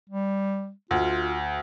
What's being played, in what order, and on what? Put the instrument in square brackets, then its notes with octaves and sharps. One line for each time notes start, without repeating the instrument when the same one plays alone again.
[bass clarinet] G3
[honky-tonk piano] D2 [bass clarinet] F4